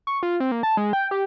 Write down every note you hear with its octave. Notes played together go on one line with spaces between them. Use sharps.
C#6
F4
C4
A#3
A5
G#3
G5
G4